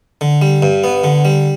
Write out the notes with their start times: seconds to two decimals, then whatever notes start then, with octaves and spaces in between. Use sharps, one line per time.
0.21 D3
0.42 G3
0.62 G2
0.84 B3
1.04 D3
1.25 G3